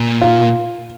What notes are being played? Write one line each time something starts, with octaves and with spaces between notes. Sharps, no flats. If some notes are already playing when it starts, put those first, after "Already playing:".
Already playing: A#2
F4